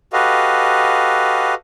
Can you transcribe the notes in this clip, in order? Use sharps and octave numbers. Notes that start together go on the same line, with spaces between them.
F#4 G4 A4 B4 D#5 F5